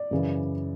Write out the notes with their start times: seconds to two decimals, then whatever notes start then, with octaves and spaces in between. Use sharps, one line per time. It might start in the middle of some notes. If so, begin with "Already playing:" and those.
Already playing: D5
0.11 F#2 C#3 E3